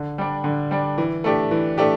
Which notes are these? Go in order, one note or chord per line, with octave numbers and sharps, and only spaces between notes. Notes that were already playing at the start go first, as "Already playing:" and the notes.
Already playing: D3
G3 D4
D3
G3 D4
E3
A3 D4 G4
E3
A3 D4 G4